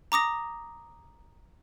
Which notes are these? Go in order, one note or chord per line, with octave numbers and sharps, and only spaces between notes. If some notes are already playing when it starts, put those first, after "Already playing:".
A#5 D6 D#6 A#6